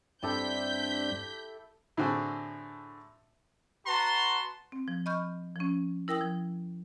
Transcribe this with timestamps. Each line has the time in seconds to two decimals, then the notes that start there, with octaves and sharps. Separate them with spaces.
0.23 G2 C4 D4 E4 G4 A4 G6 B6
1.97 A2 D3 C4 F#4 G#4
3.86 F#4 B4 A5 A#5 C6
4.72 C4
4.88 F3
5.06 D#5 B5 C#6 F6 G6
5.56 F3 C#4
6.08 E4 A#4 G5 D#6 E6
6.21 F3